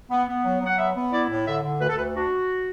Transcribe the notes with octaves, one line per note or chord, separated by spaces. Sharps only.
B3
B3
F#3
F#3 F#5
B3 E5
B3
E4 D5
A2
D3 E5
D3
D2 B4
A4
D2 B4
D4 F#4